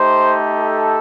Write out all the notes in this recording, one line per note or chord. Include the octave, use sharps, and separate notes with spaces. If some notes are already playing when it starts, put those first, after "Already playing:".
Already playing: A3 D#4 G4 C5
A4